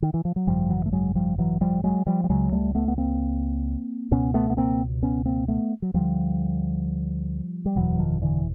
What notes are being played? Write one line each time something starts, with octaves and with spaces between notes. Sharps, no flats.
D#3
E3
F3
F#3
G#1 F#2 C#3 F3 G3
E3 F#3
A3
F#3 G#3
F3 G3
E3 F#3
F3 G3
F#3 G#3
F3 G3
G3
C#2 C#3 F#3 G#3
G3 A3
A3 B3
B3
A#3 C4
C#2 B2 B3 C#4
A3 B3
B3
A#3 C4
B3 C#4
A#3 C4
A3 B3
F#3
D2 D3 F3 G3
G3
F#1 E2 B2 E3 F#3
D#3 F3
D3 E3